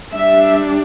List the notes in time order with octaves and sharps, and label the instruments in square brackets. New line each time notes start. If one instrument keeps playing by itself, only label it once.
[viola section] G3 D4 E5